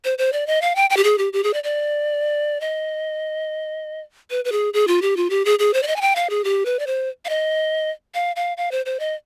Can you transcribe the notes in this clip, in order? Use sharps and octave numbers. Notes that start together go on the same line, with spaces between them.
C5
C5
D5
D#5
F5
G5
G5
G4
G#4
G4
G4
G#4
D5
D5
D#5
B4
B4
G#4
G#4
F4
G4
F4
G4
G#4
G#4
C5
D5
D#5
G#5
G5
F5
G#4
G4
B4
D5
C5
F5
D#5
F5
F5
F5
C5
C5
D#5